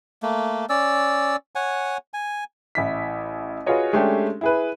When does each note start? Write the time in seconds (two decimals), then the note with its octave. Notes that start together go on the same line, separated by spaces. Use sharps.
0.23 A3 A#3
0.69 C#4 D5 E6
1.55 C#5 F#5 G#5
2.14 G#5
2.75 A1 E4 B6
3.66 F4 F#4 G#4 B4 C#5 D#5
3.93 G#3 A3 C#4 D4 G4
4.41 E4 G#4 B4